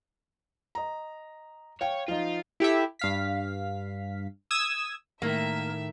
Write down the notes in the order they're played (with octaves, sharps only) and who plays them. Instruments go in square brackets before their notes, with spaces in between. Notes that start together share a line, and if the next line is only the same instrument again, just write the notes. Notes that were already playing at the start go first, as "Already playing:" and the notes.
[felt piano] D#5 A#5
[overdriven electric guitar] C#5 [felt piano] F5 G5
[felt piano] F3 D#4 [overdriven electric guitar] F4
[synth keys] E4 G4 A4 E5
G2 F5 B6
D#6 E6 G#6 E7
[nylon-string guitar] A2 D#3 [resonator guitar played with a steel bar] A#3 [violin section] E5